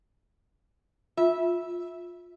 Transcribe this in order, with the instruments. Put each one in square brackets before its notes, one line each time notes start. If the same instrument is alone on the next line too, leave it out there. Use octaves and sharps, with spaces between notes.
[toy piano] F4 [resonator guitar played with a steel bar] E5